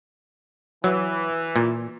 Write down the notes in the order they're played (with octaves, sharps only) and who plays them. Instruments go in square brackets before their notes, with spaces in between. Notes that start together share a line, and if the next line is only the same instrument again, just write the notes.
[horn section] E3 [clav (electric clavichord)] F#3
[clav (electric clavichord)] A#2